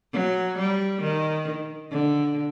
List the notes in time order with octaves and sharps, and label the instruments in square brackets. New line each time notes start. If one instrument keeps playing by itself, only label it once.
[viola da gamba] F#3
G3
D#3
D3